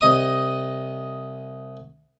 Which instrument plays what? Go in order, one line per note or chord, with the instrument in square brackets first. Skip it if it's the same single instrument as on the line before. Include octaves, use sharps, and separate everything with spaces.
[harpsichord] C2 D#5 D#6